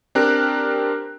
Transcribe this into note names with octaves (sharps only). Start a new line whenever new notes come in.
C4 D4 G4 A#4 F#6